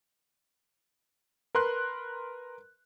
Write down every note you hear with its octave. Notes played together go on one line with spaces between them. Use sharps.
A#4 B4 C6 F#6